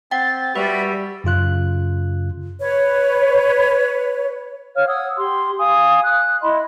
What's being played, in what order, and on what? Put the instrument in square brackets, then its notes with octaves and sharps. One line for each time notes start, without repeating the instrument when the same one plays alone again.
[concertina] C4 [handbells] F#5 G5 [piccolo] A6
[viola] G3 [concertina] F#4 E5 B5 [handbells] B4
[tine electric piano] F#2 C#3 F4 F#6
[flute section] B4 C#5
C#5 F5 F6
F#5 D#6 E6 G#6
G4 C6
F5 G#5 D#6
F#6
E4 D#5 B5 C6